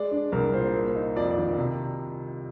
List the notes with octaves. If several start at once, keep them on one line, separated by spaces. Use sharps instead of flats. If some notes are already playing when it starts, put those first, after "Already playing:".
Already playing: G#3 D5
D4
C2 A#4
A#2 C5
A#3
D#4
F2 D5
D5
D#3
C3